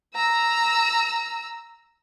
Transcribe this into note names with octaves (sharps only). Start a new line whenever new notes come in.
A#5 E6